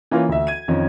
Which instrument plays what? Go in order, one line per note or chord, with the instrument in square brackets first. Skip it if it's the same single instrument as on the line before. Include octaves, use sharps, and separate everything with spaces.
[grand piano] E3 A#3 C#4 F4 A#4
D2 E5
G#6 D#7
F2 D#3 C#4